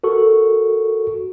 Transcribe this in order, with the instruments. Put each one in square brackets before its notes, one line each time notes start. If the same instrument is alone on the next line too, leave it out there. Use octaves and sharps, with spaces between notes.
[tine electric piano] F#4 A4 A#4 C#6